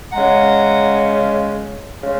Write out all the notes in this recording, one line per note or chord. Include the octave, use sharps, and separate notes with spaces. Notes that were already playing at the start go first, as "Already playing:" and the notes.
C#3 G#3 F#5 A#5
C#3 G#3